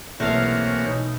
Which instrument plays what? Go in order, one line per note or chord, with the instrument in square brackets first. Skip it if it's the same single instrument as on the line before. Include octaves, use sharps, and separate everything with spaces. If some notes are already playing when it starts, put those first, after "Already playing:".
[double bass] B1 [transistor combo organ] C3 A#3 F#5 [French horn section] E3 C#5 [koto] A3 F5
[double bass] B2 D#4